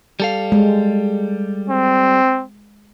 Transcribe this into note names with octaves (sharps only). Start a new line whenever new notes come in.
G3 A4 F5
G#3
C4